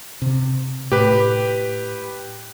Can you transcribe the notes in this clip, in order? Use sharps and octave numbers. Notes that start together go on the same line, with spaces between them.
C3
A2 G4 B4